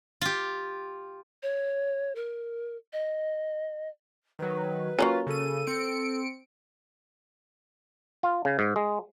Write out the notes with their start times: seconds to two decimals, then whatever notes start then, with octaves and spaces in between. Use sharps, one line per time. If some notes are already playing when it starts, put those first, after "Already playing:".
0.21 F4 G4
1.43 C#5
2.15 A#4
2.93 D#5
4.39 D#3 F#3 B4
4.99 F#3 A#3 C#4 F4
5.27 C#3 A4 D#7
5.67 C4 C#7 D7
8.23 F4
8.45 C#3
8.59 G#2
8.76 G#3